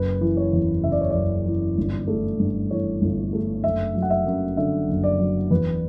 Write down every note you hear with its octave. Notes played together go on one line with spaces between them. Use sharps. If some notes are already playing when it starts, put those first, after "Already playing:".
Already playing: F#1 B4
E3
C#5
E2
C#3 E5
D5
C#5
F#1 D5
E3
G1
A3
G2
E3 C#5
G1
A3
F#1 E5
F#3
F#5
E5
F#2
D3 E5
F#1
D5
F#3
E2 B4